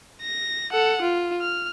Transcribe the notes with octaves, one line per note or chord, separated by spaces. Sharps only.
A#6
A4 F#5
F4
F6